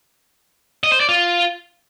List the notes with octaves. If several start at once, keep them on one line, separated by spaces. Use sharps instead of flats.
D#5
C5
D5
F4